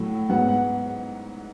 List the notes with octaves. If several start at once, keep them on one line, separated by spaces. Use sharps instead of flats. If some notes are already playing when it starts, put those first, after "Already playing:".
Already playing: A2 F#3 A3
G#2 F#3 B3 F#5
F#5